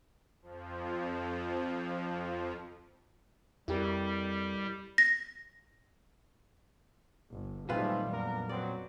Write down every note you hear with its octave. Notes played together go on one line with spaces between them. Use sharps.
F2 F3
F2 G3 E4 G4 A#4
A#6
G1
F#2 A#2 D#3 G3 A3 C4 F4 B4
F2 B3 D4 A#4
F#3 B3 C4 D5